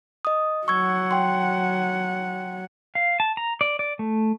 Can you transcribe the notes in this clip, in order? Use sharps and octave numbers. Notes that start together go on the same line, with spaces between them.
D#5 D#6
F#3 F#5 C#6 E6 G#6
G5 C6
F5
A5
A#5
D5
D5
A3